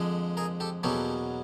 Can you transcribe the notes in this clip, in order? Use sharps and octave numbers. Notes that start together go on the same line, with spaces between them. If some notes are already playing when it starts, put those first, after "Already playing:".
Already playing: F2 D3 F3 G#3
G#4 A#4
G4 A4
E2 B2 F#3 A#3 C#4 G4 A4